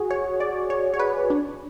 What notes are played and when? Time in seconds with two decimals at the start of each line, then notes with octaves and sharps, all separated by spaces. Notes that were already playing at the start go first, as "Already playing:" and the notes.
Already playing: F#4 G#4
0.10 C#5
0.40 D5
0.70 C#5
0.94 C#5
0.99 B4
1.30 D4